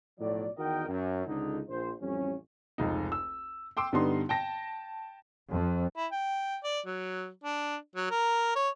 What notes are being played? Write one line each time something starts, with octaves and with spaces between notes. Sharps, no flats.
B1 A2 F3 F#3 D5
E2 D#3 F#4 A#4 D#5 G5
F#2
C#2 D3 D#4
A#1 C5
A1 F2 G3 C#4
F1 C#2 D#4
E6
G5 C6 D6 E6
G2 D3 G3 B3 D#4 C6
G5 A5 A#6
F2
E4
G5
D5
F#3
D4
F#3
A#4
C#5